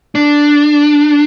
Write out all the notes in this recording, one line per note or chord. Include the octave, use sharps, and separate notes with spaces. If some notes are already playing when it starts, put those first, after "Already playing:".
D4